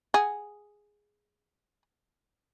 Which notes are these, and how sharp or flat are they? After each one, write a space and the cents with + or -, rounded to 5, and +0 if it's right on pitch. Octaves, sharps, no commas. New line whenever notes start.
G#4 +0 F#5 +0